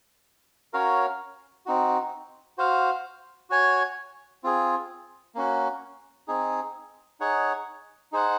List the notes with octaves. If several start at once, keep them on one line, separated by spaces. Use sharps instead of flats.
C#4 F#4 A#4 C#5 F5
C4 D#4 F#4
F#4 C5 F5
F#4 C#5 G#5
C4 F4 G#4
A#3 C#4 F#4
C4 D#4 G#4
D#4 G#4 C#5 F#5
D#4 G#4 C5 F#5